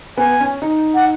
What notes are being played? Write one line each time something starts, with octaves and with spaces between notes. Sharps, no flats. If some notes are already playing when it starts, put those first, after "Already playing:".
B3 G#5
C#4
D#4
F#5